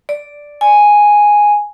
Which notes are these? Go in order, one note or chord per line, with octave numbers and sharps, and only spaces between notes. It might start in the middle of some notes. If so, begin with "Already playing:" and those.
D5
G#5